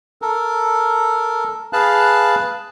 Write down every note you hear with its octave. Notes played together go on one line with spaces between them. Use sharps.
A4 A#4
G#4 B4 F5 A5 F#6